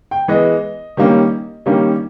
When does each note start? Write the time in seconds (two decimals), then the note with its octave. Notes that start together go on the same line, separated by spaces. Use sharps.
0.11 G5
0.28 E3 G#3 B3 D#5
0.97 D#3 G3 A#3 C#4
1.66 D#3 G3 A#3 C#4